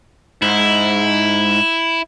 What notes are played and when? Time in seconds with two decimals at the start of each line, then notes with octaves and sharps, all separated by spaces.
0.42 G#2 E4